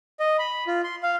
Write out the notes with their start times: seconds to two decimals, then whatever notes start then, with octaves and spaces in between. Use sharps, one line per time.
0.20 D#5
0.39 B5
0.67 F4
0.84 C6
1.03 F5